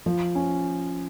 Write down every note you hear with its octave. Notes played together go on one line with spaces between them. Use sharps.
F3
C#4